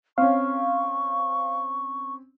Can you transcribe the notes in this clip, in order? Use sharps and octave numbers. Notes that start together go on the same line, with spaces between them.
C4 C#4 F5 C#6